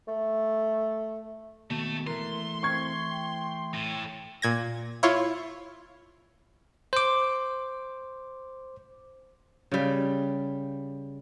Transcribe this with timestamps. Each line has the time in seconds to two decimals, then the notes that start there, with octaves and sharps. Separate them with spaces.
0.08 A3
1.71 D#2 B2 A3
2.07 E3 A3 A#4 C6
2.63 C4 C#6 G#6
3.12 G5
3.74 A2
4.42 A#2 G#6 A#6
5.03 E4 F4 C#5
6.93 C5 D6
9.72 C#3 G3